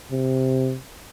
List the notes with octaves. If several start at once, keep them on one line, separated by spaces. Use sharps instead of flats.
C3